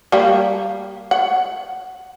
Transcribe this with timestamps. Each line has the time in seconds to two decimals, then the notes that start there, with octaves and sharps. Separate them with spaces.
0.12 G3 A#3
1.11 F#5